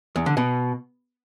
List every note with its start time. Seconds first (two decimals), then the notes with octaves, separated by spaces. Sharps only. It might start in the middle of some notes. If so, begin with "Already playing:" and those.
0.16 E2
0.26 D3
0.37 B2